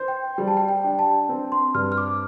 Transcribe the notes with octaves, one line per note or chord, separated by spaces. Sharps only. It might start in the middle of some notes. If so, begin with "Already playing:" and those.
Already playing: C5
G5
G3 G5
A5
G5
G5
D4
A5
C4
C6
G2 F6
F6
D6